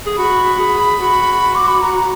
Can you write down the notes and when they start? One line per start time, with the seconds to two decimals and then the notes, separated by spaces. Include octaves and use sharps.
0.06 G#4
0.18 F#4 B5
0.59 G#4
1.00 F#4
1.55 D6
1.68 B5
1.81 A#5